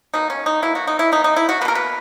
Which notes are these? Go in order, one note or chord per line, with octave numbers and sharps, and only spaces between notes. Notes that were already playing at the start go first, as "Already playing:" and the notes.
B2 A#3 D#4
C#4
D#4
B2 A#3 E4
F#4
D#4
E4
B2 A#3 D#4
D#4
E4
F#4
B2 A#3 A#4 B4
B4